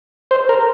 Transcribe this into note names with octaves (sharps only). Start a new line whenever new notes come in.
C5
A#4